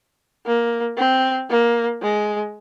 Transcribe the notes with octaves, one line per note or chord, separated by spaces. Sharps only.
A#3
C4
A#3
G#3